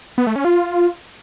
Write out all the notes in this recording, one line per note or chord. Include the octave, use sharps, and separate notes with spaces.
B3
A3
C#4
F4